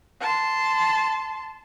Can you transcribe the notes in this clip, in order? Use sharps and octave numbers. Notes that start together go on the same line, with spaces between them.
A5 C6